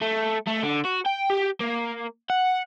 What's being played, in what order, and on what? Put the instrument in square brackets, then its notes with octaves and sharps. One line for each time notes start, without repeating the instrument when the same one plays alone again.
[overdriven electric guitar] A3
A3
D3
F#4
G5
G4
A#3
F#5